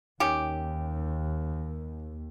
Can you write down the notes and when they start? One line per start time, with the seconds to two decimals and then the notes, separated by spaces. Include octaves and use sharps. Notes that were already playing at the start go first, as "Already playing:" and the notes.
0.20 D#2 D#3 C#4 G4